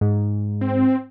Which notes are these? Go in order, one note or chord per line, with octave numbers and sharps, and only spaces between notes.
G#2
C4